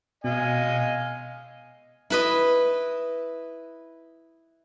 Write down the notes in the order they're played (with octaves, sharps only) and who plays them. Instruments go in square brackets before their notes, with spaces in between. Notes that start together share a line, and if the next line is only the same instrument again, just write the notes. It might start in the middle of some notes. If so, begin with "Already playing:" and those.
[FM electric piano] B2 [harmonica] D#5 F5 G#5
[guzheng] E4 B4 D#5